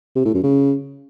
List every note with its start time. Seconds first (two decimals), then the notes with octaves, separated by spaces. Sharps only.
0.16 C3
0.25 A2
0.34 F#2
0.43 C#3